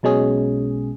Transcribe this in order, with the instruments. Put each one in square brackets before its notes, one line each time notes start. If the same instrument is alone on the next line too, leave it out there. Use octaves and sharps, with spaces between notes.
[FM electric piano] B1 B2 G#3 C#4 G#4